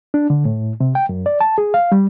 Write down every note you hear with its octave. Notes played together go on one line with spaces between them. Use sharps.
D4
D3
A2
C3
G5
F#2
D5
A5
G#4
F5
G3